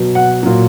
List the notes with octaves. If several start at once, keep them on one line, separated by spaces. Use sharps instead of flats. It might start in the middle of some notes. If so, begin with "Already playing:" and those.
Already playing: B2 F#3
F#5
A#2 F#3